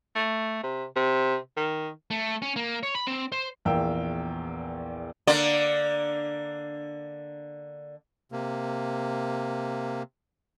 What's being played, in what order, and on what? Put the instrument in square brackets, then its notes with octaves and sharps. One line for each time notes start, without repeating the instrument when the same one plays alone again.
[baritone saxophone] A3
C3
C3
D#3
[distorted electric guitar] A3
C#4
A#3
C#5
B5
C4
C5
[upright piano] A#1 E2 A#4 F5 G5 E6
[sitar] D3 A#3 D5
[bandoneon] C3 A#3